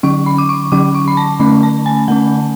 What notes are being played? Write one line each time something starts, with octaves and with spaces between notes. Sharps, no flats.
D3 F#3 C#4 C#6
B5
D6
C#6
D3 F#3 C#4 D6
C#6
B5
A5
D3 A3 C#4 B5
A5
G#5
D3 A3 C#4 F#5